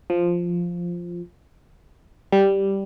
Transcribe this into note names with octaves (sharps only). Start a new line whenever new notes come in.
F3
G3